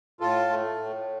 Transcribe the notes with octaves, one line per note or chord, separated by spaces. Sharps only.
A2 F4 A4
A3
A2